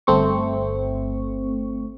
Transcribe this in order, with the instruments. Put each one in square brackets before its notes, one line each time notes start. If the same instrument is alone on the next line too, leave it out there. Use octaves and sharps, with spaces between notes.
[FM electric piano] G1 A3 C4 C#6